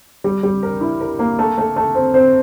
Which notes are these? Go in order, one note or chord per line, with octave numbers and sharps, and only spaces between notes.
G3
G3
A#4
E4
A#4
A#3
A3
A3
A3
C4
C4